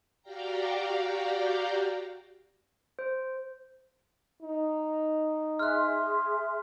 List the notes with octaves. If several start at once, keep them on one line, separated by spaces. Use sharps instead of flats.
F#4 G4 D5 F5 G5 A#5
C5
D#4
G#4 E5 C6 F6 F#6